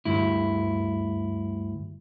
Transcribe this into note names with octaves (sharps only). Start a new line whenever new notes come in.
D2 G2 E4